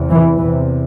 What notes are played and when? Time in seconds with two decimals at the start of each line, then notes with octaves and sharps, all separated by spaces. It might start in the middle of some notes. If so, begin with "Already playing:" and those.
Already playing: E2 C3
0.10 E3
0.38 E2 C3 E3